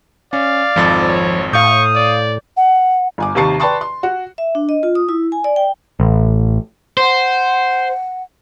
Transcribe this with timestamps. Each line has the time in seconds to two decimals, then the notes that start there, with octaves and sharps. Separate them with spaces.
0.33 C#4 D5 F5
0.76 G#1 F2 F3 A6
1.09 C#5
1.53 A2 F5 C#6 D#6 G6
1.96 D5
2.57 F#5
3.18 G1 G#5 D6
3.35 D#2 C3 D#3 A5 C#6 C7
3.60 B4 D5 G5 A5 C6 C#6
3.81 C6
4.03 F#4
4.38 E5
4.55 D4
4.69 D#5
4.83 F4
4.95 D#6
5.09 E4
5.32 G#5
5.44 D5
5.56 G5
6.00 A1
6.97 C5 F#5